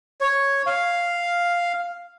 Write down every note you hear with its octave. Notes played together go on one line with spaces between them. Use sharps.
C#5
F5